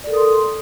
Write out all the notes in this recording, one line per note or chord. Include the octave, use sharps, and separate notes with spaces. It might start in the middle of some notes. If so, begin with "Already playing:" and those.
A4 A#4 D5 C6 D#6